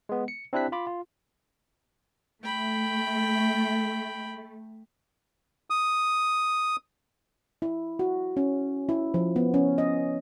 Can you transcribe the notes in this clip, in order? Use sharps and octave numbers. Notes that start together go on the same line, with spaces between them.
G#3 B3
C#7
C4 D4 E4 G4 F#6 B6
F4 B5 D6
F4
A3 G5 B5
D#6
E4
F#4
C#4
E4
F3
B3
C#4
D#5